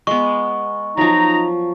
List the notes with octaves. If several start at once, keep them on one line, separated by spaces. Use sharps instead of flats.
G#3 B3 C#6
F3 F#3 D#4 A#5